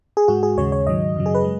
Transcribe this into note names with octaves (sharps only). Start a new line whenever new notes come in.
G#4
G#2 G#3 F#4
G#4
D#2 C#3 G#3 C#5
C#5
G#2 D#3 F#3 D#5
F#2 C#3 F#3
G#4
B4
G#3